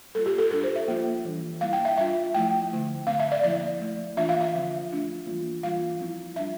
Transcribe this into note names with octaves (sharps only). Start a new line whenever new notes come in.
G3 A#3 F4 A4
G4
A4
G3 D4 F4 A4
C5
E5
F3 A#3 F4
E3 G3 D4
G3 A#3 E4 F5
G5
E5
G3 D4 F4 E5
F3 A3 E4 G5
D3 A3 E4
D3 A3 C4 F5
E5
D5
D3 F3 A#3 E4 D5
A3 E4
E3 A#3 D4 F4 E5
F5
E5
D3 F3 C4 F4
A3 D4 F4
E3 G3 A#3 F4
E3 G3 A#3 F4 F5
F3 C4 E4
G3 D4 F4 E5